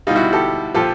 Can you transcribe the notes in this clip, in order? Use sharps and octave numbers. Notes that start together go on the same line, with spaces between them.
B2 G3 D#4 F4
E4 F#4
G4 A4
A#2 F3 G4 A4